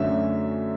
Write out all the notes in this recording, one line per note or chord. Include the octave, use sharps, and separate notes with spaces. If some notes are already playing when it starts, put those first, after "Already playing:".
Already playing: F#2 D3 A3 C#4 E5